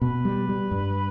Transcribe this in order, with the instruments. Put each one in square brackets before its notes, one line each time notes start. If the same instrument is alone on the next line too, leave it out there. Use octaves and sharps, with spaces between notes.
[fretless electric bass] B2 [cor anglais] B4
[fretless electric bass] G3
G3
G2